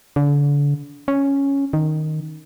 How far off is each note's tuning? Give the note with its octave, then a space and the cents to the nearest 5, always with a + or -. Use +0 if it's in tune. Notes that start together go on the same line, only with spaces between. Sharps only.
D3 -35
C#4 +0
D#3 -5